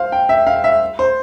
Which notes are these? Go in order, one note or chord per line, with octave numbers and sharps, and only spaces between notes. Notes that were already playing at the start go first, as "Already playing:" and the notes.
Already playing: C5 F5
G5
E5
F5
E5
C5